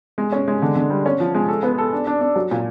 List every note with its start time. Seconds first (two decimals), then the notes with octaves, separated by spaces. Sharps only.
0.18 G#3
0.32 C#4
0.48 G#3
0.62 D3
0.76 D3
0.90 G3
1.06 C#4
1.20 F3
1.34 G#3
1.48 A4
1.63 B3
1.78 A4
1.93 D4
2.07 D4
2.21 D4
2.35 F#3
2.51 A#2